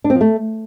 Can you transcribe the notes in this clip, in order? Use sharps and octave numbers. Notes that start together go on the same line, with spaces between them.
D4
C4
F3
A3